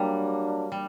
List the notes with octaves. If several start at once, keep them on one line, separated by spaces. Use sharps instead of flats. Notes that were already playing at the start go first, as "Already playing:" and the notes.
Already playing: F#3 G3 A#3 D4
G3